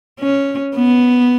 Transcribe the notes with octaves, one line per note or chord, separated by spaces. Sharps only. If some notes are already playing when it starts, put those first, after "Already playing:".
C#4
B3